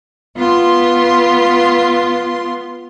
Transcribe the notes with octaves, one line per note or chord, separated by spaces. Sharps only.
B3 F4 C6